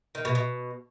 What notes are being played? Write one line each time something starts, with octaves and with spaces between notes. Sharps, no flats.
D#3
B2
B2